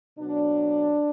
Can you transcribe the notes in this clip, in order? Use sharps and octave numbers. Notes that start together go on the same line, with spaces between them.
B2 F#3 D4